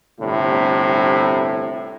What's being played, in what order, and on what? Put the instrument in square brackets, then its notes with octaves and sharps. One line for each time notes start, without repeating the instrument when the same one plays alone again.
[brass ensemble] G1 A2 C3